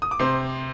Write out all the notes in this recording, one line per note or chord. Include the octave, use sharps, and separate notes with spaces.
D#6
D6
C3 C5 C6